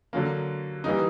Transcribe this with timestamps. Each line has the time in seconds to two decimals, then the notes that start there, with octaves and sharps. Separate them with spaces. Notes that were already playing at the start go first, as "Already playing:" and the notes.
0.13 D3 F#3 A#3
0.84 E3 G3 A#3 D#4